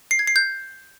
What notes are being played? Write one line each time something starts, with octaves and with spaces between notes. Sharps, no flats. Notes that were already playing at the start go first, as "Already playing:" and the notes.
C7
G#6
C7
G6